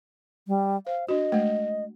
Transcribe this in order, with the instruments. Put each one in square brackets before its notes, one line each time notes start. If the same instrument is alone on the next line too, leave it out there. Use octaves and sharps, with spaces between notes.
[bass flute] G3
[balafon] C5 [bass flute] F5
[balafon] D4 F#4 [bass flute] D#5
[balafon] G#3 A3